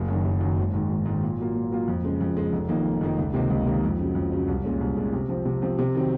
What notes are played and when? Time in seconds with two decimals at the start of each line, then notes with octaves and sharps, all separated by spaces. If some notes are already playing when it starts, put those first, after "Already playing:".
Already playing: F#1
0.08 F#2 D#3
0.25 F#1
0.41 F#2 D#3
0.58 G#1
0.74 G#2 D#3
0.90 G#1
1.06 G#2
1.11 D#3
1.23 A#2
1.39 F#3 A#3 F4
1.55 A#2
1.71 F#3 A#3 F4
1.88 F2
2.04 C#3 G#3
2.21 F2
2.36 C#3 G#3
2.53 F1
2.69 F2 D#3 A#3 D#4
2.85 F1
3.01 F2 D#3 A#3 D#4
3.18 C#2
3.34 C3 D#3 A#3 D#4
3.50 C#2
3.66 C3 D#3 A#3 D#4
3.83 F2
3.99 C#3 F#3
4.15 F2
4.32 C#3 F#3
4.48 C2
4.64 A#2 G#3 C#4
4.81 C2
4.97 A#2 G#3 C#4
5.13 C3
5.29 F3 C4
5.45 C3
5.62 F3 C4
5.79 C3
5.95 D#3 F#3 C4